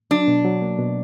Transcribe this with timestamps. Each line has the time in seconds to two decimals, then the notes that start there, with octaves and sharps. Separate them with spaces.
0.11 F#3 D4
0.28 B2
0.45 F#3
0.62 A#3
0.79 B2